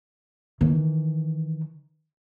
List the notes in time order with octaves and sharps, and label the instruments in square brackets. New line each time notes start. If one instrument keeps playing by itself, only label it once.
[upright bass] D#3 E3